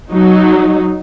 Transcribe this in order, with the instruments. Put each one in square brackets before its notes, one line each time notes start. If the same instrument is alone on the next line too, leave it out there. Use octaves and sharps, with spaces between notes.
[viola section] F#3 D#4